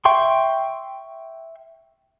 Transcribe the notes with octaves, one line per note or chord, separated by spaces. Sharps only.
E5 G5 C6 C#6